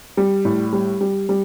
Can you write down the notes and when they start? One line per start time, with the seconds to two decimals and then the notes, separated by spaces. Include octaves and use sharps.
0.17 G3
0.45 A2
0.73 G3
1.01 G3
1.29 G3